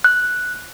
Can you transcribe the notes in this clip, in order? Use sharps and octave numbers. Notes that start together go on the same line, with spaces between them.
F#6